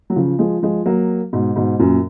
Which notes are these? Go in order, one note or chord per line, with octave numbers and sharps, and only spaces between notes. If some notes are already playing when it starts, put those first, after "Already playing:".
F#3
C#3 F3
F3 G#3
F3 G#3
F#3 A#3
G#2 B2
G#2 B2
F#2 A#2